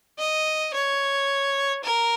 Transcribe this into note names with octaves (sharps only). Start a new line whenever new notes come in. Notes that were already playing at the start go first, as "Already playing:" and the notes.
D#5
C#5
A#4